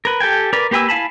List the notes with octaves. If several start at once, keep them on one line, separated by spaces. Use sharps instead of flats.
A#4 B4
G4 A4 G5 G#5
A#4 B4 D5
A#3 G4 B4 G#5 E6
E4 F5 G#5 A5 B5